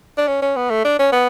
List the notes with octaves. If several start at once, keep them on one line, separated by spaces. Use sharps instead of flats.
D4
C#4
C#4
B3
A3
D4
C#4
B3